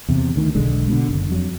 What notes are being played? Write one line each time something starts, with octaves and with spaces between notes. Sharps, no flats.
E2 C3
D2 D#3
E1 B1 D3 G#3
B2 D3
F#1 D3
F2 F#3